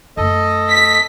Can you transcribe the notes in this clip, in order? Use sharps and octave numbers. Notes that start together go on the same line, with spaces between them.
F#2 A3 A4 D#5
B6